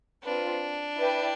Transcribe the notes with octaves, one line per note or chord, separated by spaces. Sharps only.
C4 D4 F4 B4
E4 B4 D5 G5